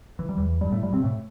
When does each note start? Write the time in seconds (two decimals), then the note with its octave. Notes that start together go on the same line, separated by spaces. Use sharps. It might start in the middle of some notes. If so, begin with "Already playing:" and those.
0.19 E3
0.29 G3
0.37 E2 E3
0.61 G2 G3
0.72 A2 A3
0.83 G2 G3
0.93 C3 C4
1.03 A2 A3